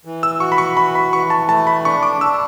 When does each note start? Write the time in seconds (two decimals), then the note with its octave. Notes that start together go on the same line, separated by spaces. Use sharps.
0.05 E3
0.23 E6
0.40 F#4 C#6
0.52 B5
0.58 C#6
0.77 E3 B5
0.95 B5
1.12 E3 C#6
1.30 A5
1.48 A3 A5
1.67 B5
1.84 D4 C#6
2.03 D6
2.21 D4 E6